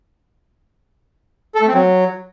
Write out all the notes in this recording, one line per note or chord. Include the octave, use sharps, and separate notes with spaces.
A4
A3
C4
F#3